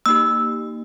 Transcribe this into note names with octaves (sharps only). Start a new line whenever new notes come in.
A#3 D#4 G4 E6